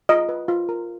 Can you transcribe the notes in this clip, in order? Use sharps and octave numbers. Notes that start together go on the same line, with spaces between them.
F4 D#5
B4
F4
A#4